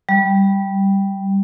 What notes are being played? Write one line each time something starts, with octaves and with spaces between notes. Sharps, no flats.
G3